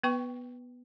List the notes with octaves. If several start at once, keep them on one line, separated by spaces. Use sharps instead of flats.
B3 B4 G5 C#6